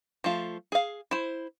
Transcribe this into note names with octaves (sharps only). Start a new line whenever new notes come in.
F3 A3 F4
G#4 F5
E4 C5